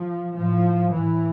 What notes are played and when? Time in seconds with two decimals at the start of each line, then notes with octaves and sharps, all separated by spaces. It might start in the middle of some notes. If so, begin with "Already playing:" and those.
Already playing: F3
0.35 A2 F3
0.90 A2 E3